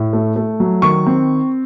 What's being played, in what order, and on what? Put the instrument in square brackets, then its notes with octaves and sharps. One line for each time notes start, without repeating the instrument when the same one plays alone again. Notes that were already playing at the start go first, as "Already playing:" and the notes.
Already playing: [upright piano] A2
A3
A3
F#3
D#3 C#6
C4